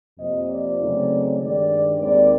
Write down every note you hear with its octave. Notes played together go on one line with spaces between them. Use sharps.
F2 C3 F3 A#3 D#5
D5
C#3 F#3 A3 C4 D#4
G2 D#3 G#3 D5
D#2 D#3 G#3 C4 D5